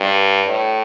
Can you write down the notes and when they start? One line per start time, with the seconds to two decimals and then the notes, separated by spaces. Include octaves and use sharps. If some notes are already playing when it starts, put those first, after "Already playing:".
Already playing: G2
0.47 A2